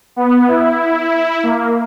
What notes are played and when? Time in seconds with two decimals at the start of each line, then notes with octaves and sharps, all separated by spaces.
0.16 B3
0.48 E4
1.43 A#3